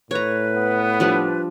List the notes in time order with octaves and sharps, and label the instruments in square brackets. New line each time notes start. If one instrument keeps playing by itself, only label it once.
[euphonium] A2 [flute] B4 [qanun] C#5 A#5
[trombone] B3
[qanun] F3 G3 D4